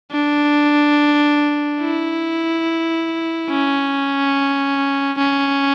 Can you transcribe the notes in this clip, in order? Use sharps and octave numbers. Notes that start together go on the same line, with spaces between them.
D4
E4
C#4
C#4